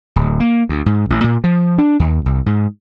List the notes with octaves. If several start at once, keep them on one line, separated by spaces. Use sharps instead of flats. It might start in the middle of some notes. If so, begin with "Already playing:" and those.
D1
A#3
D2
G#2
A1
A#2
F3
D4
D#2
C2
G#2